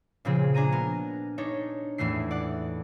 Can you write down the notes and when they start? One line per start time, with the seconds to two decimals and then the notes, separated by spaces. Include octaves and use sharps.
0.25 A#2 C#3 F3 C4 G#4
0.54 D4 G#5 A#5 D#7
0.72 B3 A#4
1.38 D4 D#4 C#5
1.98 E2 A2 E3 A3 C7
2.31 D5 F#5